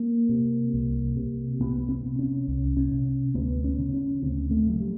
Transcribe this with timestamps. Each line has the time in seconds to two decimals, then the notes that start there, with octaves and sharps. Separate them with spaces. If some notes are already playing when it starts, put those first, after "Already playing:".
Already playing: A#3
0.29 C3
0.74 C2
1.16 C3
1.60 C2 B3
1.89 C4
2.03 C3
2.19 C#4
2.48 C2
2.77 C#4
2.91 C3
3.34 D2 B3
3.64 C#4
3.79 C#3
3.94 C#4
4.22 D2 C4
4.51 A3
4.66 C#3 F#3
4.80 G3